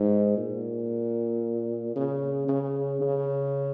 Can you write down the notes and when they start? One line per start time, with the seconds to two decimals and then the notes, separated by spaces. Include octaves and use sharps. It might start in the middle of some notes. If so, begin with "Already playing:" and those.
Already playing: G#2
0.37 A#2
1.96 C#3
2.48 C#3
3.01 C#3